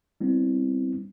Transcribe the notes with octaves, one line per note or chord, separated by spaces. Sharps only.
G3 B3 C4 D4 E4